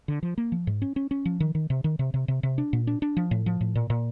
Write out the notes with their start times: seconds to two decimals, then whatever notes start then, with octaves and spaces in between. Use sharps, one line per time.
0.08 D3
0.23 F3
0.38 A#3
0.52 F3
0.67 G#2
0.82 C#4
0.96 C#4
1.11 C#4
1.25 F3
1.40 D#3
1.55 D#3
1.70 C3
1.84 D#3
1.99 C3
2.14 C3
2.28 C3
2.43 C3
2.58 D4
2.73 A#2
2.87 D4
3.02 D4
3.17 F3
3.31 A2
3.46 F3
3.61 A2
3.75 A#2
3.90 A#2